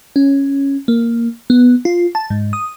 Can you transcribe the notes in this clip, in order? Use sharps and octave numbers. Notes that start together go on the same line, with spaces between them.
C#4
A#3
B3
F4
A5
G#2
D#6